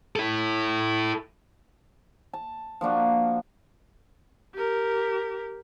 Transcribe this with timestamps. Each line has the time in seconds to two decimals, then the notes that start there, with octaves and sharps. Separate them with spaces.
0.16 E4 A4
2.33 A5
2.81 F3 A#3 D4 F#4
4.55 G4 A#4